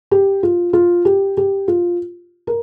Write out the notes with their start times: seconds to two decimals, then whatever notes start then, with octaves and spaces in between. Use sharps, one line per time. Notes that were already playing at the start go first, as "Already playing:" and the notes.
0.11 G4
0.43 F4
0.73 F4
1.05 G4
1.37 G4
1.68 F4
2.47 A#4